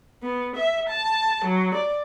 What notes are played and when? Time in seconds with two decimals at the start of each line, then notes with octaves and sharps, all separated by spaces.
0.22 B3
0.56 E5
0.89 A5
1.44 F#3
1.74 D5